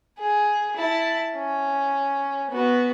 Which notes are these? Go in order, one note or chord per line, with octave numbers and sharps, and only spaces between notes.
G#4
E4 A5
C#4
B3 F#4